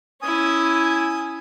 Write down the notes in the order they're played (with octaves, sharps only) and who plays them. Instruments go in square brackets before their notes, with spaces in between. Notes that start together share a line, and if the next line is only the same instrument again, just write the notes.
[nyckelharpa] C#4 E4 [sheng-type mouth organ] G#5 D#6